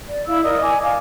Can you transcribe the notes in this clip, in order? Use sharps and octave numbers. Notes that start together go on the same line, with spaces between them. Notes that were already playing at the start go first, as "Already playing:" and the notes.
D5
E4 F5 E6
A#4 D5 D#5 D#6
G#5 D6
D5 F5